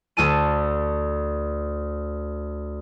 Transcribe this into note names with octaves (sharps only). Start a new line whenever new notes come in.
D2 A4 A5 D#7